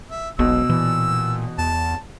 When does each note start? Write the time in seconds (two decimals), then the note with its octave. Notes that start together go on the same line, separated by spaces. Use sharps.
0.11 E5
0.39 E1 B1 B2 E6
0.69 A#2 E3
1.58 E2 A5